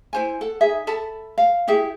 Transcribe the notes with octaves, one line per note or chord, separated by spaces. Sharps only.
E4 C5 G#5
A4 F#5
D#4 G#4 E5
A4 E5 A5 B5
F5
E4 G4 G#4 E5